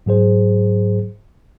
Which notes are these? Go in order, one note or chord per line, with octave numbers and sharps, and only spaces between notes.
G#2 F#3 G#4 C5